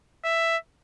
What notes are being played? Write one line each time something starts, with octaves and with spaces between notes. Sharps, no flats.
E5